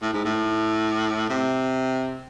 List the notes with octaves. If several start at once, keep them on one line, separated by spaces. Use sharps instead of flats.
A2
G#2
A2
C3